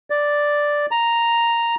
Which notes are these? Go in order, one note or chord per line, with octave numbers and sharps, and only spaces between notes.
D5
A#5